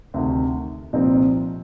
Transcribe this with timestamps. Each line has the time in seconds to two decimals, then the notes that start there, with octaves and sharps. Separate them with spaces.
0.14 D2 C3 D#3
0.93 C2 A#2 F3 C4 D#4